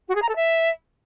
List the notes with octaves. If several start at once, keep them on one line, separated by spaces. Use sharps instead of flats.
F#4
G#4
A#5
A4
E5